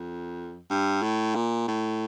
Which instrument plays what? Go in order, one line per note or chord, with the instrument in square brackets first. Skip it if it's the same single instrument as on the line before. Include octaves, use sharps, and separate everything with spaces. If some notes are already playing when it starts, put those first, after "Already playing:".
Already playing: [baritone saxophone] F2
G2
A2
A#2
A2